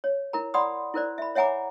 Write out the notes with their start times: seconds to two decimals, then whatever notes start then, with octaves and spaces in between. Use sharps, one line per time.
0.04 C#5
0.33 E4 A#4 A#5
0.54 D5 F#5 B5 C6 D#6
0.94 E4 A#4 C5 D5
1.18 E5 B5
1.35 C#5 E5 F#5 G#5 A#5 D6